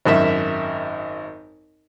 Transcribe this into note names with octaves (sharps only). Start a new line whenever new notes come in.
G#1 F#2 E5